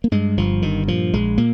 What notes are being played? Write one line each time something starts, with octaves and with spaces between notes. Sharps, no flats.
A#3
G2 G#3
G1 F3
G2 D#3
A#2 F3
A#1 G#3
A#2 A#3